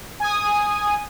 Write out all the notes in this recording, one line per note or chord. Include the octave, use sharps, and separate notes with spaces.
G#5 D#6